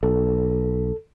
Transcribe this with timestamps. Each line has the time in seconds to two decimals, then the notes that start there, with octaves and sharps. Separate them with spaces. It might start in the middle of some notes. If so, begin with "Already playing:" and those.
0.03 B1 A4